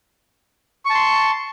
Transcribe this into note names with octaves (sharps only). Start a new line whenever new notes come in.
A5 C6 C#6